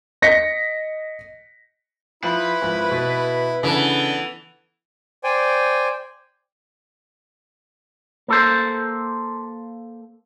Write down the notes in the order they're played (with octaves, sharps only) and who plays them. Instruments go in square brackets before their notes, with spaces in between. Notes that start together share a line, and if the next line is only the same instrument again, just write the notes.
[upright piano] D#5 A#6 B6 C#7
[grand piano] F3 [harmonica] E4 [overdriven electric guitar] B4
[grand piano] G#1 F3
B2
[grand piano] C#3 D4 [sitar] E3 [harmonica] B3 A4
[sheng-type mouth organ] C5 D5 G5 G#5
[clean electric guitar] A#3 A4 C5